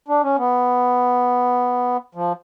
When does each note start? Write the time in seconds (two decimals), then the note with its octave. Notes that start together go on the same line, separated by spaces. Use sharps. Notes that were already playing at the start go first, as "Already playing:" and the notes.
0.08 D4
0.23 C#4
0.38 B3
2.15 F3